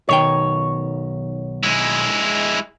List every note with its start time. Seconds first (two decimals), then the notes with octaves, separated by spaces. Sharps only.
0.09 B1 D#3 C#5 G5
1.63 G#3 E4